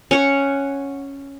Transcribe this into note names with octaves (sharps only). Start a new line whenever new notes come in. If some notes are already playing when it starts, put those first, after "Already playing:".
C#4 C#5 F#5